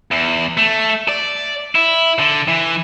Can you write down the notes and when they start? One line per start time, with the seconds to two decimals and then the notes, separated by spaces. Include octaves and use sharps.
0.11 E2
0.57 A3
1.09 D5
1.75 E4
2.19 D3
2.48 E3